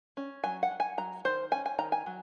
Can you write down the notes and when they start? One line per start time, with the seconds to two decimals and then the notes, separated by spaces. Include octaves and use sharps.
0.17 C#4
0.44 F#3 G#5
0.63 F#5
0.71 F#3
0.80 G#5
0.98 F#3 A#5
1.25 D#3 C5
1.52 C#4 G#5
1.66 G#5
1.79 D#3 A#5
1.92 G#5
2.06 F#3